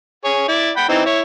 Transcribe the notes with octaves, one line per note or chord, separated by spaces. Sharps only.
G#4 C#5
E4 D5
F#5 G5 B5
E3 C4 D#4
E4 C#5